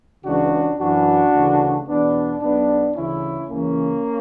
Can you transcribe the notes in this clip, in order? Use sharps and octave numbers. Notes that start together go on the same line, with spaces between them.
C#2 C#3 E3 D4 F#4
F#2 E3 D4 F#4
D2 C#3 E3
E2 B2 B3 D4
B1 B2 B3 D4
D2 C#3 E3 C#4 E4
C#2 C#3 E3 A#3 C#4